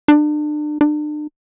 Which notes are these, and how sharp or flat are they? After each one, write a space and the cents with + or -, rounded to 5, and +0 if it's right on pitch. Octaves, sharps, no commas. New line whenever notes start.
D4 +35
D4 +40